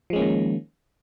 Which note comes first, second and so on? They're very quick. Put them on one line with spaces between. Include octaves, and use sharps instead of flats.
F3 G#3 C#4 A#3 D#3